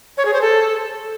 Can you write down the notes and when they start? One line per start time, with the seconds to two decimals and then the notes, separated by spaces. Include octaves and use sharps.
0.17 C#5
0.25 G#4
0.33 C5
0.41 A4